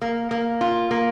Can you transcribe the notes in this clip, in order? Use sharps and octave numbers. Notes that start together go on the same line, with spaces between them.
A#3
A#3
F4
A#3